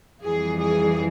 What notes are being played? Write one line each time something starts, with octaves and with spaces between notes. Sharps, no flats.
F2 E3 G3 G#4
G#4